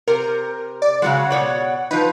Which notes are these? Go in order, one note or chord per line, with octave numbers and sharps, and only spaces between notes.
C3 A#4
D5
C#3 F#3 G#3 F#5
B2 C#5 D5
F3 D#4 B4